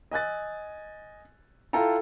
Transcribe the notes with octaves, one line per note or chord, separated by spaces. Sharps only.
D#5 G#5 F#6 A6
E4 F4 A4 G5 A#5